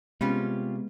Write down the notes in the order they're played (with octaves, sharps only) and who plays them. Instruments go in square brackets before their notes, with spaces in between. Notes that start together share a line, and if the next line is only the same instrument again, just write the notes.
[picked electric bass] C3 [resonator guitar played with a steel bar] G3 C#4 F4 [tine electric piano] G#3 B3